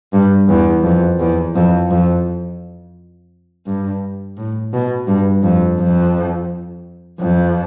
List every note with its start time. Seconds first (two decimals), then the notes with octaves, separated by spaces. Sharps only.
0.13 G2
0.49 E2
0.84 F2
1.19 E2
1.55 F2
1.91 F2
3.66 G2
4.37 A2
4.73 B2
5.07 G2
5.43 F2
5.79 F2
7.20 F2